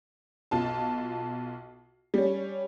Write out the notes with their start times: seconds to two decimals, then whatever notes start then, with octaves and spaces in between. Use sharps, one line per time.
0.51 B1 F4 A5
2.14 G3 C#4